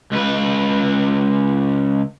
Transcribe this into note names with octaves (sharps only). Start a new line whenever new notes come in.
C#2 B4